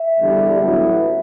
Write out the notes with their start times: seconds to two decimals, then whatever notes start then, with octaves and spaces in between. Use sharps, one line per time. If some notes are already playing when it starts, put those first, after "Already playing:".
Already playing: E5
0.19 E2 D3 G3
0.59 A1 A2 F#3 B3